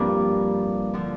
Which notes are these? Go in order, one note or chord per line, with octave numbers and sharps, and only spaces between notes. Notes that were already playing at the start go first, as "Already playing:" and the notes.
Already playing: G2 F3 A#3 C4 D4
D3 F3